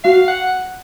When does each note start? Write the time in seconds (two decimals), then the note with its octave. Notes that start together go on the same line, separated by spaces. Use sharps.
0.04 F#4 F5
0.28 F#5